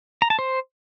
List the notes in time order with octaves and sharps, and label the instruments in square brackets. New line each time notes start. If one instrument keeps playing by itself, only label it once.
[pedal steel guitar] A#5
A5
C5